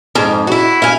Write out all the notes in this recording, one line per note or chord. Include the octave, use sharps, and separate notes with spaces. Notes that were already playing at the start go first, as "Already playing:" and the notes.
F2 G#2
E4 F#4
E4 F5 G#5